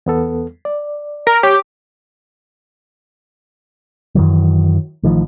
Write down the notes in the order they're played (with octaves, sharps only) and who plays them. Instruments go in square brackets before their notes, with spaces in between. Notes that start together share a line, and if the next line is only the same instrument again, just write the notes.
[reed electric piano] E2 B3 A4
D5
[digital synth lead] A#4 [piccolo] A#5
[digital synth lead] G4 [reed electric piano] C#5 [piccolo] D6
[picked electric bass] F#2 D#3 E3 F#3
A1 A2 D#3 F3